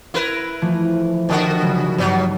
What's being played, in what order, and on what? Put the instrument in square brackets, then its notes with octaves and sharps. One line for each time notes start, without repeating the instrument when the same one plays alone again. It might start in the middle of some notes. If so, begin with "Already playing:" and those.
[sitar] E4 A#4 B4
[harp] E3 F3 A3
[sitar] B2 D3 F#4 [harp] G4 G5 A5
[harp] C#3 F#3 G#3
[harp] G2 D#4 [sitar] B2 F#3